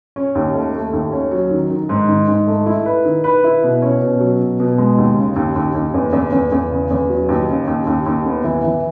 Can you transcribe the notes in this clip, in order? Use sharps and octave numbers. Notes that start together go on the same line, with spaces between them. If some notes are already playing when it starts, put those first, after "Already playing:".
C#4
D#2
A3
A3
D#2
C#4
F#3
D#3
D#3
G#2
D#3
G#2
A3
E4
B4
D#3
B4
E4
B2
C#4
B2
F#3
B2
B2
G#3
D#2
C#3
D#2
D#2
D#2
E2
E2
E2
E2
C#3
E2
F#3
D#2
C#3
D#2
D#2
D#2
B3
E3
E3